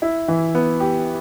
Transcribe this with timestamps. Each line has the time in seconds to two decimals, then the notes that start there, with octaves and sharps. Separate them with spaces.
0.02 E4
0.28 E3
0.55 B3
0.80 G4